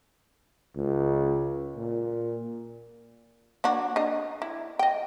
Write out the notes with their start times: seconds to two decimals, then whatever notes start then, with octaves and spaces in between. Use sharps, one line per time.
0.76 C#2
1.76 A#2
3.64 A#3 D4 F#4
3.96 D4 D#5
4.42 E4
4.79 D#5 G5